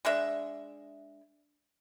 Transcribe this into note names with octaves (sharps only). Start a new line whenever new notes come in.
G#3 D4 E5